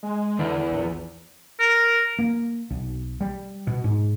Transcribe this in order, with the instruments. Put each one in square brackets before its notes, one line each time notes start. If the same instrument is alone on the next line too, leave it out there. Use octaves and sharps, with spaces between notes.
[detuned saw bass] G#3
[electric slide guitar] E2 [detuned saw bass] D3
[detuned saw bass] E3
A#1
[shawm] A#4
[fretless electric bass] A#3
B1
G3
B2
G#2